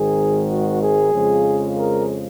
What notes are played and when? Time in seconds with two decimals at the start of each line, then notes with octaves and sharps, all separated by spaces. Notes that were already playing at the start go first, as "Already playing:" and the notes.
Already playing: G#1 G#2 D#3 G#3 G#4
0.50 F#4
0.81 G#4
1.13 F2 C#3 F3 G#3
1.77 A#4